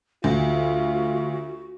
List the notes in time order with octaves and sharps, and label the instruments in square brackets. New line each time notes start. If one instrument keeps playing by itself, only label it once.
[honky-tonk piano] D2 [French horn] F4 [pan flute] F#4